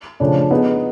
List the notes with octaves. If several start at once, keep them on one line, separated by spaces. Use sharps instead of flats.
C#3 F3 A3 D4
B3 D#4 G#4